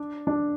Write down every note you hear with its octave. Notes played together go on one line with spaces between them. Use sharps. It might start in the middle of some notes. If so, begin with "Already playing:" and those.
Already playing: D4
D4